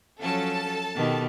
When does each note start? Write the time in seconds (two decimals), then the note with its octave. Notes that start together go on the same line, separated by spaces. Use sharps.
0.20 F3 F#3 C#4 A4 A5
0.94 B2 D#3 G4